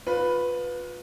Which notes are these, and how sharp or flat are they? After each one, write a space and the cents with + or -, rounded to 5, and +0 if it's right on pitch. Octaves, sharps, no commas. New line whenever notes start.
F4 +30 B4 +0